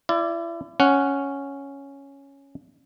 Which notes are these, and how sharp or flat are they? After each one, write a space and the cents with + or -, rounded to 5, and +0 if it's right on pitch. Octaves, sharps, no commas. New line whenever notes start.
E4 +35 D5 +0
C#4 +0 F#5 +0